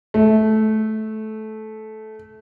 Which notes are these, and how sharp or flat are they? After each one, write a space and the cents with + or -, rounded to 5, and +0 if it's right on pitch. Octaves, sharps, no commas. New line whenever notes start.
A3 -15